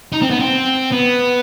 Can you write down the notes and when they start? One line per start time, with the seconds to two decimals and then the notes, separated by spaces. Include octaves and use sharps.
0.12 D#4
0.22 C4
0.30 B3
0.40 C4
0.92 B3